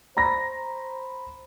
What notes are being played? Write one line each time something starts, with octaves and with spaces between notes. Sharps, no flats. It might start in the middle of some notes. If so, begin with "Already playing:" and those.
C5 A#5 B5 A#6